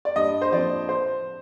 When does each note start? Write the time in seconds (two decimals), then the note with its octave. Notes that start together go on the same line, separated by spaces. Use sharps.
0.05 D5
0.16 G2 D#5
0.42 C5
0.52 F3 C4 D5
0.89 C5